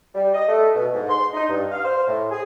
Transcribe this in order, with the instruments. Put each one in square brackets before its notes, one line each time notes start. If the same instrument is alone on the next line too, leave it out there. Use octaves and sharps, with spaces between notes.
[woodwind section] G3
D#5
A3
B2
G#2
C6
D#4
G2
F5
C5
A2
G#4